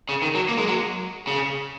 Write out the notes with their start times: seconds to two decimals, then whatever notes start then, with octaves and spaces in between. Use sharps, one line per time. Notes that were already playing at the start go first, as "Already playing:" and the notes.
0.09 C#3
0.22 D#3
0.35 F#3
0.48 A#3
0.58 G#3
0.68 F#3
1.27 C#3